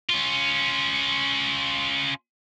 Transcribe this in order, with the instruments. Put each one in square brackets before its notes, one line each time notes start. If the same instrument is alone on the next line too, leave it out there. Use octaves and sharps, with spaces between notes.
[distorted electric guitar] C#4 F4